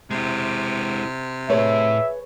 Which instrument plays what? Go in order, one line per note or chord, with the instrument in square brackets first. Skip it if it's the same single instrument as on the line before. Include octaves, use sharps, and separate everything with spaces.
[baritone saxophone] C3 [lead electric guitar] G#3 E4
[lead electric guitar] A2 A3 [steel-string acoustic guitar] G#4 B4 C#5 [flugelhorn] E5